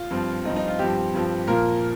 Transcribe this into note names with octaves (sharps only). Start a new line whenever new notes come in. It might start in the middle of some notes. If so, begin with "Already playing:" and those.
Already playing: F4
G2 F3 C4
G2 F3 C4 D#4
D#4
F4
G2 F3 C4 G4
G2 F3 C4
A#2 F3 A#3 A#4